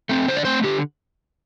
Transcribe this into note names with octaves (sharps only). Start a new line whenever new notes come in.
A3 C4
D3 C5
D5
A3 C4 C5
D3 G4